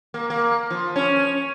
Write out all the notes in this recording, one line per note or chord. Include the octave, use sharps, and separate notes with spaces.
A#3
A#3
F3
C#4